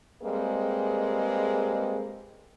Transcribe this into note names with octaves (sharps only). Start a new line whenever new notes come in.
G3 G#3 A#3 C4 G#4 B4